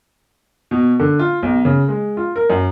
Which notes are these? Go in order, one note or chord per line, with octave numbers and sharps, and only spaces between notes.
B2
D3
F4
B1
C#3
G#3
F4
A#4
F#2